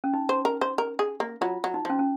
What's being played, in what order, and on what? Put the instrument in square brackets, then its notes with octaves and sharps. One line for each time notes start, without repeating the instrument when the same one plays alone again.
[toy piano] C#4
D#4
[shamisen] C5
A#4
C5
A#4
G#4
A#3
[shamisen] F#3 [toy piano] F4
[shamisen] F#3
[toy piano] D#4
[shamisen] F3 [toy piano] C#4
[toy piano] C#4